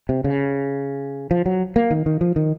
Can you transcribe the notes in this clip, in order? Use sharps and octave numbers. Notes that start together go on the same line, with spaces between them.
C3
C#3
F3
F#3
A#3
D#3
D#3
F3
D#3